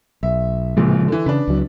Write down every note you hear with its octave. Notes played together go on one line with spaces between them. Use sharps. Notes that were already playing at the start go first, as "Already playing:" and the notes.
B1 E5
D1 A#1 A#2 C#3 F3 G#3
D3 E3
C#3 D4 B4
C#2 F#3